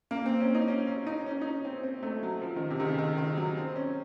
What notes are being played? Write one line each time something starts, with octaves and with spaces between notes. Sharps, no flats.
A#3
C4
C#4
D#4
C#4
C#4
D#4
C#4
D#4
C#4
C4
C4
A3
F#3
F3
D#3
C3
D#3
C#3
D#3
D#3
F#3
C4
C#4